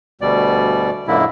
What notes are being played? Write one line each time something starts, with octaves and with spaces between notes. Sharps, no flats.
D2 B2 G3 D5
F#2 A#2 D3 G#3 A#3 E4